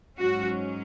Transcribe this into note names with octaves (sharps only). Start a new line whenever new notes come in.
G#2 F#3 C#4 F#4